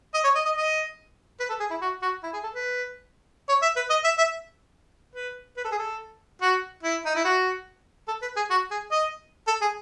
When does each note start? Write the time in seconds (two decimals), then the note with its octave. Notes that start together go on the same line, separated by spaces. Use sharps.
0.14 D#5
0.24 C#5
0.35 D#5
0.45 D#5
0.55 D#5
1.40 B4
1.49 A4
1.60 G#4
1.70 E4
1.81 F#4
2.02 F#4
2.23 E4
2.33 G#4
2.43 A4
2.54 B4
3.49 C#5
3.62 E5
3.76 B4
3.90 D#5
4.04 E5
4.18 E5
5.15 B4
5.57 B4
5.64 A4
5.72 G#4
5.78 A4
6.41 F#4
6.83 E4
7.05 D#4
7.15 E4
7.25 F#4
8.08 A4
8.22 B4
8.36 G#4
8.50 F#4
8.71 G#4
8.91 D#5
9.47 A4
9.61 G#4